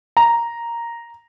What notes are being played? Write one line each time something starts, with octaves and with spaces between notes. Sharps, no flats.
A#5